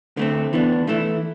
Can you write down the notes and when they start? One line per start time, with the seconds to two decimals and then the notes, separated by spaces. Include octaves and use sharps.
0.17 D3 A3 C4
0.53 E3 B3 D4
0.87 E3 A3 E4